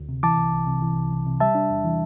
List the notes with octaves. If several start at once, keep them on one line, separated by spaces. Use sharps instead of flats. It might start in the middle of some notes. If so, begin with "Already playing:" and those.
Already playing: D2
C3
E3 A5 D6
C2
C2
C3
E3
C2
C2
C3
G3 E5 A5
D4
E2
E3